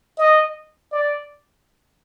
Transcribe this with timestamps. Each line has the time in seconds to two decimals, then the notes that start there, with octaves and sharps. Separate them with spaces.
0.18 D#5
0.92 D5